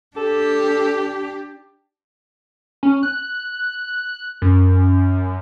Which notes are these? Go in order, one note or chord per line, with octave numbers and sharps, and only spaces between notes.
D4 G4 A4
C#4
F#6
F#2